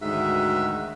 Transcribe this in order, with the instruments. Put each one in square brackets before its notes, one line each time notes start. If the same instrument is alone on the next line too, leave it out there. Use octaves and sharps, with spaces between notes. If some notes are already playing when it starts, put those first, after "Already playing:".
[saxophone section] D2 G#2 D#3 F#4 E5